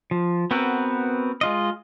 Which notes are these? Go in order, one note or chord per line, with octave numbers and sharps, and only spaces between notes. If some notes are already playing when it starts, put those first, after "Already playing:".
F3
B3 C4 F#4 A#4 B4
G#3 F4 D#5